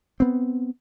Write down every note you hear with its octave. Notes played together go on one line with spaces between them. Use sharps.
B3 C4